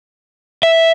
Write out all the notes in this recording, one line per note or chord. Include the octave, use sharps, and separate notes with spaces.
E5